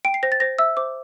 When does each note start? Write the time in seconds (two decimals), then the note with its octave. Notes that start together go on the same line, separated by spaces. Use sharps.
0.05 G5 D7
0.14 C7
0.23 C5 A#6
0.32 A6
0.40 C5 A#6
0.59 E5 E6
0.77 C5 D6